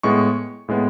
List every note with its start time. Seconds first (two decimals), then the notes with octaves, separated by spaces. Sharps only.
0.03 A2 G#3 B3 C#6
0.68 A2 G#3 B3